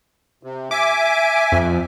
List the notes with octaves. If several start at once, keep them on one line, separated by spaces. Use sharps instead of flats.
C3
E5 G#5 D6
F2